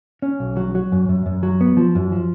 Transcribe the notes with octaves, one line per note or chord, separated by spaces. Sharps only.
C#4
B1
F#3
F#3
F#2
F#2
F#2
F#3
B3
F3
F#2
F3